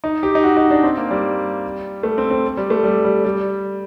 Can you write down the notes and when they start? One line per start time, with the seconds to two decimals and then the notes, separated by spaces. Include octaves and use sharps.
0.04 D#4
0.23 G4
0.35 D#4
0.43 F#4
0.57 D#4
0.71 D4
0.83 C4
0.97 A#3
1.11 G3
2.03 A3
2.18 C4
2.30 C4
2.57 G3
2.70 A3
2.84 G3
3.05 G3
3.24 G3